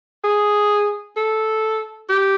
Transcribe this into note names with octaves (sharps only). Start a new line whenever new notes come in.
G#4
A4
G4